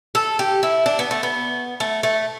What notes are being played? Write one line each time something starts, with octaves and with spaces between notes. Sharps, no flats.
A4
G4
E4
D4
B3
A3
B3
A3
A3